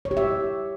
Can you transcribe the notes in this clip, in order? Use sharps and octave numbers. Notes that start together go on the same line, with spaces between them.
C#5
G4
E5